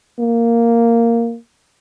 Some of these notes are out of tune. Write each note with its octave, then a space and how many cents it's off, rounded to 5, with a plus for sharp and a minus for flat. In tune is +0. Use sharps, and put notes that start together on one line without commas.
A#3 -5